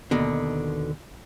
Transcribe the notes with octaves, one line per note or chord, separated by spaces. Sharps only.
D#2 B2 D3